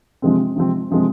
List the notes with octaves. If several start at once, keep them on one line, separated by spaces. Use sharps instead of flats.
C3 F3 G#3 C4
C3 F3 G#3 C4
C3 F3 G#3 C4